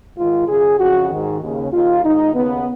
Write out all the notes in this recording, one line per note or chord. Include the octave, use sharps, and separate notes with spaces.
G#2 D#3 F4
F#2 C#3 G#4
F2 C#3 F#4
G#2 D#3
D#2 C#3
D#2 D#3 F4
G#2 D#3 D#4
D#2 C#3 B3